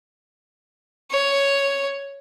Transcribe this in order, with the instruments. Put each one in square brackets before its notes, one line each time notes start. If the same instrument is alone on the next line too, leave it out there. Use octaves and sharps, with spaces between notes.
[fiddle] C#5